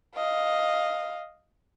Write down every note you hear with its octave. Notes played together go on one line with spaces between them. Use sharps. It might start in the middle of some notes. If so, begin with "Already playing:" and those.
D#5 F5